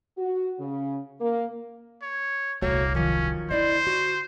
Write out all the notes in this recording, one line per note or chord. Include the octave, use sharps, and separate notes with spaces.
F#4
C#3
A#3
C#5
D#1 C2 A3 A#3 F#4 C#5
D#3 F3 F#3 C#4
D3 E4 C5 D5 D#5
F#4